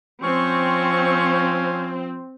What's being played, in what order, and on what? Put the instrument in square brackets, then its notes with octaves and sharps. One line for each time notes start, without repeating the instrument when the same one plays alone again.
[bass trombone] F3 [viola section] C4 [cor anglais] C#4 [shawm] C#6